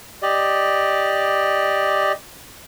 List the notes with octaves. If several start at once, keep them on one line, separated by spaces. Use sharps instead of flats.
G4 D5 D#5